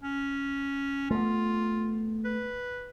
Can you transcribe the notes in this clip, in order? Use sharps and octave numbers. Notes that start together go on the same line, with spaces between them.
C#4
A3 B3 F4
B4